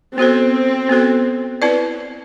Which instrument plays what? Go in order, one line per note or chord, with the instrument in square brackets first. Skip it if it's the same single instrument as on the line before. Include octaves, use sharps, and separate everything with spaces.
[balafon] B3 F#4 A4 C5 [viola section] C4
[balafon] B3 F#4 A4 C5
C4 E4 B4 D5